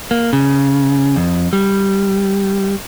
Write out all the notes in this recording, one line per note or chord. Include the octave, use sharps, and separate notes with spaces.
A#3
C#3
F2
G3